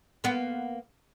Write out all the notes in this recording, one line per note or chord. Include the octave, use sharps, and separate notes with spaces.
A#3 B3